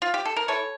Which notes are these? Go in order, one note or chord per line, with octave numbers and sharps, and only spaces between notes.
F4
G4
A4
A#4
E3 A4 C#5